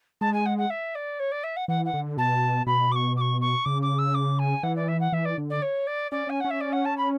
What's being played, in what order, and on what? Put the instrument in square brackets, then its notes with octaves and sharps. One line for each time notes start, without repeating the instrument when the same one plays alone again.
[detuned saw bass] G#3 [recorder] A5
[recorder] G#5
F#5
F#5
E5
D5
C#5
D5
E5
F#5
[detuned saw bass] E3 [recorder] F#5
[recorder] F#5
[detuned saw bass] D3
[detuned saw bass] B2 [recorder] A5
[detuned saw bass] B2 [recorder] B5
[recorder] D6
C#6
D6
C#6
C#6
[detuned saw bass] C#3 [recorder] D6
[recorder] D6
E6
D6
G#5
[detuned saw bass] E3 [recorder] F#5
[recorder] D5
E5
F#5
[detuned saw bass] E3 [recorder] E5
[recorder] D5
[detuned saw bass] D3
[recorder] D5
C#5
D5
[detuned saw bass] C#4 [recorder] D5
[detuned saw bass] C#4 [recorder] G#5
[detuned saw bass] C#4 [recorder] F#5
[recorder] E5
D5
F#5
A5
B5